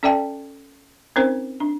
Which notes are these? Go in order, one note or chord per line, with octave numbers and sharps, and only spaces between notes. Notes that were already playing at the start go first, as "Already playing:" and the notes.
C#4 A4 D5 E5 G5 A5
C4 C#4 D#4 A#4 C5
D4